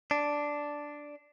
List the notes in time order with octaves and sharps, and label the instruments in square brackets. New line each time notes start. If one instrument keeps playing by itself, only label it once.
[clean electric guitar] D4